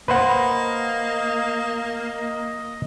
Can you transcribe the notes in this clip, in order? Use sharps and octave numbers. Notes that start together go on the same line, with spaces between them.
A#3 B4 C5 D#5 F#5